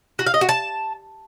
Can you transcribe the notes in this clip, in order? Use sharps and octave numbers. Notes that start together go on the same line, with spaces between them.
F#4
F5
D#5
F#4
A5